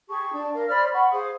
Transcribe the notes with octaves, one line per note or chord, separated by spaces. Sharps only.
G4 G#4 A5 C#6
D4 A5
A#4 F5
C5 D5 B5 F6
F#5 B5 C#6
G#4 C5 F5 D#6